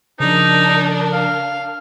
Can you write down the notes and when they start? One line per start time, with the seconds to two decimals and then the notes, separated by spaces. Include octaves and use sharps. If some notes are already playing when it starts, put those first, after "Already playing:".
0.20 C#3 F3 D4 D#4 A#4
1.13 F5